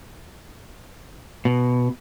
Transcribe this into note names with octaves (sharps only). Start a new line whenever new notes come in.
B2